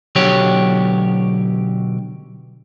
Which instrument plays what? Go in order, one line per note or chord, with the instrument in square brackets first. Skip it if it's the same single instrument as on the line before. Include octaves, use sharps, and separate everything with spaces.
[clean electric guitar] B1 D3 F#3 G4 C#5